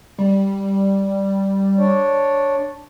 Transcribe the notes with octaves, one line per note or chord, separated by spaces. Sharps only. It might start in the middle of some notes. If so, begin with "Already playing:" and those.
G3
D4 C#5 D5